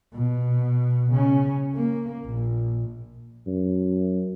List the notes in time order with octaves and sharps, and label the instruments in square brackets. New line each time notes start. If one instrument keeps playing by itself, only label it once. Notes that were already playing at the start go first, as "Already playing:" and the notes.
[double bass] B2
C#3 C#4
A#3
A#1
[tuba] F#2